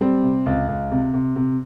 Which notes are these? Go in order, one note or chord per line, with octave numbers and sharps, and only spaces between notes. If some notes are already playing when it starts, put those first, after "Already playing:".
G3 C4
C3
C#2
C#2
C3
C3
C3